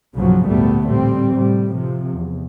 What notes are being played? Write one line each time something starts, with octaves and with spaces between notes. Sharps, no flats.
B1 G2 A#2 C#3 F3 F#3
G#1 D2 A#2 G3 A3 B3
A1 A#2 G3 C4
A2 C3 G3
C3 F3
E2